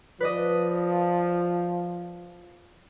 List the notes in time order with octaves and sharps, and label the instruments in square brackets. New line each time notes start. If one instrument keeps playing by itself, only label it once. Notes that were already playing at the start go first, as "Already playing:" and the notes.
[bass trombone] F3 [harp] B4 D5 D#5